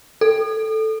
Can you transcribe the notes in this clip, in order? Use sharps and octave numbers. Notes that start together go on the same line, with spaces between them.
A4